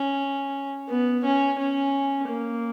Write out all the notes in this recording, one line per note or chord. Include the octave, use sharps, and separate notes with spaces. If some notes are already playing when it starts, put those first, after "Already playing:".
Already playing: C#4
B3
C#4
C#4
A#3